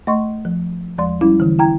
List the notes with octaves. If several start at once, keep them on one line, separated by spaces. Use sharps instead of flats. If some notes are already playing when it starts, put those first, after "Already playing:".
A3 D#5 C6 C#6
F3
E2 F3 G#3 D5 C6
G3 C#4 E4
D3 E3
E4 G5 A#5 G#6